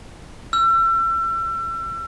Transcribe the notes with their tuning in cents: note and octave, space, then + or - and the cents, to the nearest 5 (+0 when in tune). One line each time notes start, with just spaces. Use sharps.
E6 +35